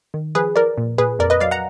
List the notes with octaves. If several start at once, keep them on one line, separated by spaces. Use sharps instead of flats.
D#3
F3 G#4 B4
F3 A#4 D5
A#2
A#2 G#4 B4
F2 A#4 D5
B4 D#5
F#3 D5 F5
F#5 A#5